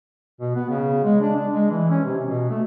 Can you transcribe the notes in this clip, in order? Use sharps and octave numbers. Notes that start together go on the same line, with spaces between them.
B2
B3
C#3
G#3
D4
D4
G#3
E3
C#4
C3
B2
A3